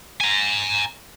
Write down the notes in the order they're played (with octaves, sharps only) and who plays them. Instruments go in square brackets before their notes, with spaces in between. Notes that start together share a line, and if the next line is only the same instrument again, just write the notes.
[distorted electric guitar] G#5 A#5